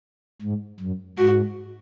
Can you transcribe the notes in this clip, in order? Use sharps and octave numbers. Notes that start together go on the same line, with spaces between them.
G#2
F#2
G#2 F#4